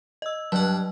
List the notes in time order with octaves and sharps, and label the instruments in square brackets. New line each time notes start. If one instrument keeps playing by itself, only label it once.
[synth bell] D#5 E6
[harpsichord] G2 F#5 [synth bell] F#3